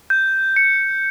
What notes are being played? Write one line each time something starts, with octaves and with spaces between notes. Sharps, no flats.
G6
C#7